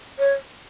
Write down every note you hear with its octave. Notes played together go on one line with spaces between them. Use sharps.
C#5